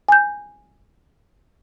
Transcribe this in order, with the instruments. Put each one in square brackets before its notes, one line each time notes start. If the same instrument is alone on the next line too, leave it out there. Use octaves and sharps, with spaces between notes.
[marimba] G#5 G6